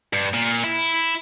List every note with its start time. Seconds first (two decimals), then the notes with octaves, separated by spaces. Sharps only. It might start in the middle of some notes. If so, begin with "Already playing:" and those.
0.13 G2
0.34 A#2
0.64 E4